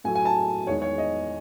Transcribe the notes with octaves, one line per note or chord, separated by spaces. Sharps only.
A2 F#3 A3 G#5
G#5
A5
E2 D#3 G#3 C#5
C#5
D#5